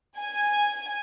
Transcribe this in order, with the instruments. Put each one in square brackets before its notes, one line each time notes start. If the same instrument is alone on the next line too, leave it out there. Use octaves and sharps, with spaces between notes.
[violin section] G#5